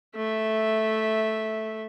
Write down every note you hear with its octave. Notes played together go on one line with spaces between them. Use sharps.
A3 E5